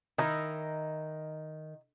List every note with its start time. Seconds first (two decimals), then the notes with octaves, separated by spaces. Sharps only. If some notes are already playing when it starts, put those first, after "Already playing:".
0.18 D#3 D#4 E4